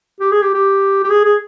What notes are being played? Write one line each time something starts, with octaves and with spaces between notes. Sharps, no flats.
G4
G#4
G4
G4
G4
G#4
G#4